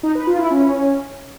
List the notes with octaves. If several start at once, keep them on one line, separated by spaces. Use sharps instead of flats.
D#4
B4
F4
E4
C#4